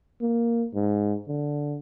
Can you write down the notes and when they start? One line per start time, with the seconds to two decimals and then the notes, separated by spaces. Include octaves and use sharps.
0.21 A#3
0.74 G#2
1.28 D3